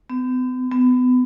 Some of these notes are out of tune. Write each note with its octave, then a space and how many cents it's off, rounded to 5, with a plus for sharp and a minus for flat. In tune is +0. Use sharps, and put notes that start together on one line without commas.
B3 +45
B3 +30